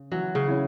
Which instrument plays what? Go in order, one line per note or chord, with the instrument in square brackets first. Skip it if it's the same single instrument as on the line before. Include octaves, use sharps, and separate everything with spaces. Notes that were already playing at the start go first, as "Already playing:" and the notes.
Already playing: [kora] C#3
[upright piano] E3 [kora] F#3
[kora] C#3
[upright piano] C#4 E4